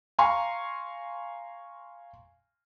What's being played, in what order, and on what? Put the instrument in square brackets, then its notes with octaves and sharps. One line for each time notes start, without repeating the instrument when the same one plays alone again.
[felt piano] F5 G#5 A#5 C6 C#6